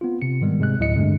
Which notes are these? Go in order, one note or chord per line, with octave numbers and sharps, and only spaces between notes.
B3 C4 F4
C3 C4 C#7
G#2 D#3 G3 G#3 B3
G#2 C3 G#3 C4 F#6
D2 A2 F#3 E4 D#5 C#7
G2 D3 G#3 A3 C4